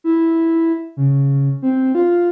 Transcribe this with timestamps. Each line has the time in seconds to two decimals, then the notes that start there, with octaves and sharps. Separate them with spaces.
0.04 E4
0.97 C#3
1.62 C4
1.95 F4